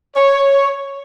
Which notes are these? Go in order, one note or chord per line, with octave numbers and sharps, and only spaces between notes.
C#5